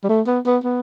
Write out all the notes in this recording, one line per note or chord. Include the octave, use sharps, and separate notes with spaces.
G3
A3
B3
B3
B3